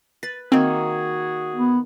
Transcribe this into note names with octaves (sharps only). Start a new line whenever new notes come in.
B4 A6
D#3 A#3 C4 F#4 G#4
B3